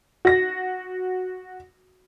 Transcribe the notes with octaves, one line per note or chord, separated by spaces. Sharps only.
F#4 A#6